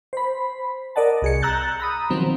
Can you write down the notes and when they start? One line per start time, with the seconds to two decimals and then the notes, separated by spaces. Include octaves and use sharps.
0.13 C5 B5
0.96 A#4 D5 D#5 F#5 A5
1.22 C2 G#4 C#7
1.42 A#5 E6 F#6 G6 A6
1.80 A#5 B5 D#6
2.10 B2 D#3 F3 F#3 C4